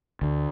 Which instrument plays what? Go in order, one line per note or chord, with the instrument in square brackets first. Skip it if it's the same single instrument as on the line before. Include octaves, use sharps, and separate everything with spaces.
[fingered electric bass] D2